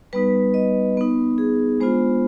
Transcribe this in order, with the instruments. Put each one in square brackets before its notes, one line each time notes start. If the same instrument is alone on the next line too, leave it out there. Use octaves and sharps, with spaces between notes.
[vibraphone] G3 B3 D#4 B4
D#5
B3 D#4
G#4
G#3 B3 D4 F4 C5